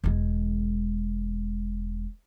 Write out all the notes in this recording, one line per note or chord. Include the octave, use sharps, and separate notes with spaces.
E1 G#3